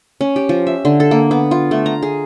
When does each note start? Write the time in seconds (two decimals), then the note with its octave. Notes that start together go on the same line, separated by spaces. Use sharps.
0.21 C#4
0.36 G4
0.49 F3
0.67 E5
0.85 D3
1.00 A4
1.11 A#3
1.31 B3
1.51 F4
1.71 A3
1.86 A#5
2.02 G#4